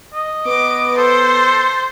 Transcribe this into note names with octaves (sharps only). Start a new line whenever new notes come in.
D#5
B3 D6
A4 C5